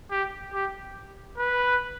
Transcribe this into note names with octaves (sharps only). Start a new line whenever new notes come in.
G4
G4
B4